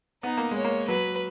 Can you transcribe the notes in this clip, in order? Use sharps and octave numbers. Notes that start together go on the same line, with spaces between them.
B3 D#4
A#3
G#3
C#5
A#3
F#3 B4